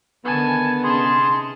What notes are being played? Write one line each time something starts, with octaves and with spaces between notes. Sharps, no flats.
D3 D#3 B3 G#5 A5
C3 C#4 D#4 G#4 A5 C6